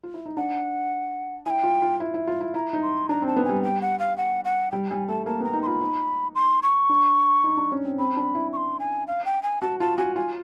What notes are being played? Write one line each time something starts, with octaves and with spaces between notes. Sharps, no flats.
F4
E4
D#4
D4 F#5
E4 G5 G#5
F4
F4
E4
E4
F4
E4
E4 A#5
D#4
C6
D4 A#5
C4
A5
B3
G3 G#5
G5
F#5
F5
F#5
F#5
G3 G5
G3 G#5
A3 A5
A#3 A5
B3 A#5
D#4
C6
F4 B5
D#4
C6
C#6
D4
D#4
D4
C#4
C4
C4 B5
D4
E4
C#6
C6
G#5
F5
G5
G#5
F#4 A5
F4 A5
F#4 G#5
F4 G#5